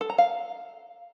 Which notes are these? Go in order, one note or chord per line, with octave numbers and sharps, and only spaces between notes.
A4
A#5
F5